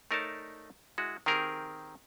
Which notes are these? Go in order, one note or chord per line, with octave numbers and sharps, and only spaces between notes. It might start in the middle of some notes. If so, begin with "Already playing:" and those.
A3 D#4 A#4 C#5 D5 A5
G#3 E4 F#4
D#3 C4 G4 G#4 A#4